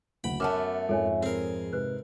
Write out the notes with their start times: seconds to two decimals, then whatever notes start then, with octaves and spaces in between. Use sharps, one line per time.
0.24 F#1 D2 F#5 G5 B5
0.40 F#2 A3 B3 E5 F#5 A5 D6 F6
0.89 F2 G#2 F3 A4 C#5 G#5
1.23 C4 G#4 A#4
1.73 G#2 C3 B4 F#6